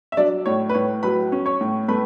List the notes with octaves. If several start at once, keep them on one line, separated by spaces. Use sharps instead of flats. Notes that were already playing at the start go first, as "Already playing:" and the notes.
E5
F#3 D4 D5
A2 C#5
B4
A2 C#5
F#3 B4 B5
C#4
C#5 C#6
A2
A3 B4 B5